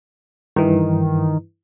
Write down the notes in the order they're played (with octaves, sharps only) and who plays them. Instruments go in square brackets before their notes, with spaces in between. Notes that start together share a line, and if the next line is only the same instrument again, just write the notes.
[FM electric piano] G2 E3 [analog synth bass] D#3